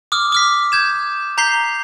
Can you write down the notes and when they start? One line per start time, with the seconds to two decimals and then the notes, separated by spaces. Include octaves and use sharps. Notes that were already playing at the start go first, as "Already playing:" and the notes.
0.12 D6 D#6 F6
0.32 D6 F6 B6
0.72 G6 G#6 E7
1.38 A#5 G6 B6 C7 G7